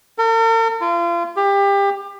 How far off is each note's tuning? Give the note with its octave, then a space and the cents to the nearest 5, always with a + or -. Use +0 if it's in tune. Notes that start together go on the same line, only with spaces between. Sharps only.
A#4 -45
F4 -35
G4 +25